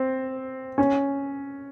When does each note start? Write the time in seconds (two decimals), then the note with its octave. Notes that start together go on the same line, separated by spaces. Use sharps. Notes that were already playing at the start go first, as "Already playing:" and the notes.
Already playing: C4
0.78 C#4